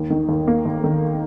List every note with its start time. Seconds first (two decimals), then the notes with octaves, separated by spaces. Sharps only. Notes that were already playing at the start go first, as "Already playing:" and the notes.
Already playing: D#2
0.10 D#3
0.29 D#2
0.47 A#3
0.66 D#2
0.84 D#3